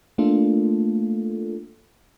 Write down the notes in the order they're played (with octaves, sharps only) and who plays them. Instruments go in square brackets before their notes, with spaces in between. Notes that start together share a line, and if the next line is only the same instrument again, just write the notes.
[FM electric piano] A3 A#3 D4 F4 A4